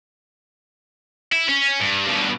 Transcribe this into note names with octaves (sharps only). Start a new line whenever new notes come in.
E4
C#4
G2
G2 B2